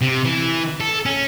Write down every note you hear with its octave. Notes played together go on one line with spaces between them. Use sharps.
C3
E3
A4
C#4